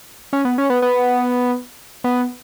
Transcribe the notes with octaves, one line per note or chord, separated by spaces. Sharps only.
C#4
B3
C#4
B3
B3
B3